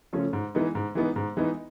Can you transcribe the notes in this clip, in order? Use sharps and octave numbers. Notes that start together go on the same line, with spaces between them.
C#3 F3 A3 C#4
G#2
E3 G#3 B3 D#4
G#2
E3 G#3 B3 D#4
G#2
E3 G#3 B3 D#4